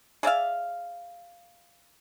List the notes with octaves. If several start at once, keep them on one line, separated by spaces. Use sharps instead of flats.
G#4 D5 E5 F5